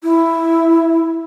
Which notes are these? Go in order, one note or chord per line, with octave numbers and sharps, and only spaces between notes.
E4